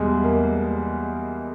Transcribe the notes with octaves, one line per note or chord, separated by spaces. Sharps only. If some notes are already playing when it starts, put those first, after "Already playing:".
Already playing: E2 B2 G3 G#3
A#3